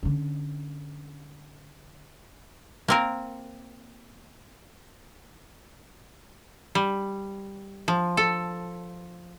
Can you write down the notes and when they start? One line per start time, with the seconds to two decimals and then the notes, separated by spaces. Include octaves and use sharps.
0.03 D3 C#4
2.88 A#3 C4 A#4
6.75 G3
7.88 F3
8.17 A4